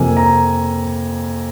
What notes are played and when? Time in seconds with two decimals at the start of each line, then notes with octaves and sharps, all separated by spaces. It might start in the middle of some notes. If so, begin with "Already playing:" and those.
Already playing: F2 C3 F3 A#3 G#5
0.17 A#5